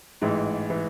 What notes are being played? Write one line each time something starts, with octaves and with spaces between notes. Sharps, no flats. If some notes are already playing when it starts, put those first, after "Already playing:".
A1 G#2 E3
E3